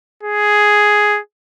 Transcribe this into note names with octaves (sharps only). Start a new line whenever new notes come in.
G#4